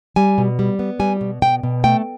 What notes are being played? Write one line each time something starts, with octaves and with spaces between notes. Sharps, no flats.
G3 G#5
B2
G3
B3
G3 G#5
B2
B2 G5
B2
A3 G5